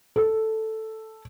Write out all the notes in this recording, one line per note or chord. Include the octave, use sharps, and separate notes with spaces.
A4